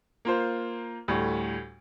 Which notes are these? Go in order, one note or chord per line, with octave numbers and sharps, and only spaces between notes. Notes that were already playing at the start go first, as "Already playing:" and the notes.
A#3 F4 C5
D2 A2 G3